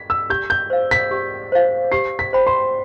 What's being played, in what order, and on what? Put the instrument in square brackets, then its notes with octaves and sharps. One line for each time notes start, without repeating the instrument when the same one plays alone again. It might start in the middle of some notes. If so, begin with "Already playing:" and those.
Already playing: [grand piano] B6
E6
[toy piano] G4 [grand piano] G6
[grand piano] G6
[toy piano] C5 F5
[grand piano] B6
[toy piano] G4
C5 F5
[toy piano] G4 [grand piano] C7
[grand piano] B6
[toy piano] C5 G5 B5
[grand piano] C6